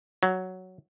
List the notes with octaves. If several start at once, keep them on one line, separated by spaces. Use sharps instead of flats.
F#3